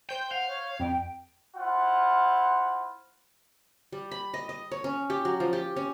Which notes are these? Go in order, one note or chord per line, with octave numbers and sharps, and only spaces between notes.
C5 G5 G6
F5 F#5
C#5
F2 G5
E4 F4 C5 F#5
G3
B5
D#5
D#5
C#5
C#4
G4
F#3
F3
G4
C#4